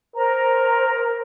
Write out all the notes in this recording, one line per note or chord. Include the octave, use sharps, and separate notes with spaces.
A#4 C5 A#5